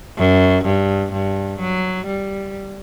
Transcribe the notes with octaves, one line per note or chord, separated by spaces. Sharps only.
F#2
G2
G2
F#3
G3